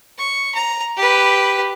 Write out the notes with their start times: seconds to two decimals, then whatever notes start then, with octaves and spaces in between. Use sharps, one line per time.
0.18 C#6
0.55 A#5
0.97 G4 B4